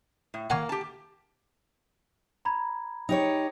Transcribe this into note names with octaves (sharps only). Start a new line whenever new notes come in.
A2
A#3 F#5 G#5 C#6
G4 A5
A#5 B5 G#6
D#4 G4 C#5